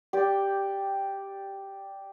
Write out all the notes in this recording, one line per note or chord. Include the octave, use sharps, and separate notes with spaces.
G4 D5 G5